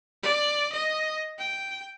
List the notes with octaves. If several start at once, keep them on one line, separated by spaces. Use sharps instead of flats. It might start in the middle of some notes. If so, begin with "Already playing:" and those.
D5
D#5
G5